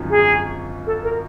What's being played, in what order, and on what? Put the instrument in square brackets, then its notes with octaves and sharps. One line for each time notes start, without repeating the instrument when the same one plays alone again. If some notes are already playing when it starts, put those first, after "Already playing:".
Already playing: [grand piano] G#1 F#2 D3 F3
[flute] G#4
A4
A#4